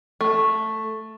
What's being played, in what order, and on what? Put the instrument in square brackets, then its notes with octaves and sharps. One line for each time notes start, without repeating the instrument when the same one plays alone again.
[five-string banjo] A3